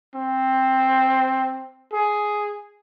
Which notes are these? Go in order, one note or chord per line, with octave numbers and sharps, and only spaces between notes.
C4
G#4